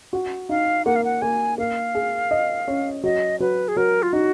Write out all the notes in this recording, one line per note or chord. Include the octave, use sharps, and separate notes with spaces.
F#4
D#4 F5
A#3 F#5
F5
F#5
A#3 G#5
A#3 F5
G#4
D#5
C#4
F#3 D#5
F#3 B4
G#4
F#3 A#4
F4
D#4 F#4